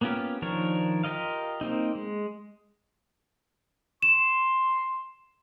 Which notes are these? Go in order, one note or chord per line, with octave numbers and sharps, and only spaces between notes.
A#3 B3 C#4 F4 G4
D#3 F3 D4 A#4 C#5
F4 G4 A#4 D#5 F5
A#3 C4 D#4
G#3
C6 E7